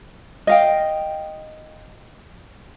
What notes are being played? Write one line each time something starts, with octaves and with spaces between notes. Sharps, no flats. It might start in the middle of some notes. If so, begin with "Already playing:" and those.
D#5 F5 G5